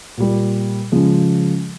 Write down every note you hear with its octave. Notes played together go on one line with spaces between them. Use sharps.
A#2 G3 A#3
C#3 F3 G#3